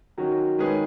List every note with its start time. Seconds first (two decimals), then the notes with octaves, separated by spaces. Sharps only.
0.18 D#3 F#3 C#4 F#4
0.58 D#3 G#3 C#4 G#4 B4